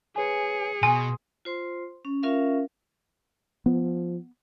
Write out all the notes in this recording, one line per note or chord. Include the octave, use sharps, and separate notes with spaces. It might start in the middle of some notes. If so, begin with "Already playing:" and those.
G#4 B4 C#5 G#5 C#7
B2 G#5 C6 D#6
F4 C5 C6
C#4
C#4 F4 A#4 E5 F5
F3 B3